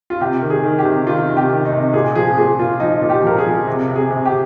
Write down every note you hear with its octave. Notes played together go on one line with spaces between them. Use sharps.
F4
C3 G4
D#3
G#4
D#3
G4
C3
D#3 F4
C3
G4
D#3
D#4
C3
A#2 G#4
F3 G#4
A#2 G#4
A#2 F4
F3 D#4
A#2
G4
F3 A#4
G#4
F3
C3
C3
G#4
C3
G4